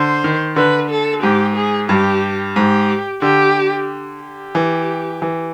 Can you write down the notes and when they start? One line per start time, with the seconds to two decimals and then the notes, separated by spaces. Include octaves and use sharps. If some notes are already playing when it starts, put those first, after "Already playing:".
Already playing: D3 C5
0.24 D#3
0.56 D3 B4
0.90 A4
1.22 G#2 G4
1.56 G#4
1.89 G2 G4
2.56 G#2 G4
3.22 D3 G4
4.21 G4
4.55 E3
5.22 E3